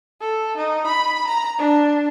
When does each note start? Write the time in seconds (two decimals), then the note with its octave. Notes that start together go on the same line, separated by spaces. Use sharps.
0.21 A4
0.57 D#4
0.86 B5
1.27 A#5
1.59 D4